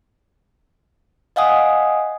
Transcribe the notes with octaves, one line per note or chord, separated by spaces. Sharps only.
D#5 F5 F#5 G#5 D#6